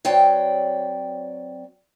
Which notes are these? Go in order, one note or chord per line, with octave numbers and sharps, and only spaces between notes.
F#3 C4 C#5 D5 G5